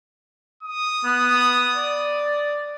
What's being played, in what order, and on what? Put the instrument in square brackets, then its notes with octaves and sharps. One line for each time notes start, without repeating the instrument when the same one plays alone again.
[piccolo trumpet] D#6
[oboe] B3
D5